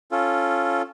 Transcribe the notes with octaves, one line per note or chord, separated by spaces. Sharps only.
C#4 F4 A4